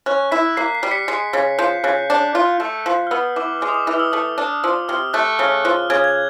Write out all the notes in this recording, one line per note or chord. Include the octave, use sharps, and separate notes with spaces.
C#4 F#6
E4 B6
A#3 C7
C7
G3
B6 C#7
G#3
C#3
F3 G6
C#3 F#6
D4
F4
A3
F3
F6
B3 E6
E3 D6
G#3 D6
D#6
D6
E3 D6
F6
E6
A3 E6
D4
F3 E6
C3 F6
A3 F#6
C#3 F6
F3 F#6
C#3 G#6
G#6